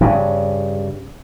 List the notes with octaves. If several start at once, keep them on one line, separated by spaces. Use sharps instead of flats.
G2 C#3